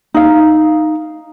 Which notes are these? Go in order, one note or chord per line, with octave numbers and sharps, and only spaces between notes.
D#4 F5